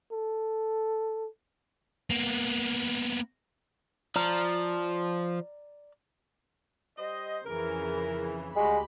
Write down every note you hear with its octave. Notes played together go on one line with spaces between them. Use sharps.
A4
A#3 B3
F3 D5 A#5 F6
G3 C5 D#5
F2 C#3 E3 A#4
D2 G3 G#3 F#4 G4 B5